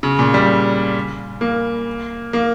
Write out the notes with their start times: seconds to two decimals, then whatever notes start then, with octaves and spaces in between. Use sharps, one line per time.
0.03 C#3
0.19 A#2
0.34 G3
1.41 A#3
2.33 A#3